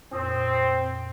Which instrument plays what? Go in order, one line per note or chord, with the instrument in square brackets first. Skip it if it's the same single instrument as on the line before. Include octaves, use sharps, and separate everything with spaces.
[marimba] F2 A#2 D#6 [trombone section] C4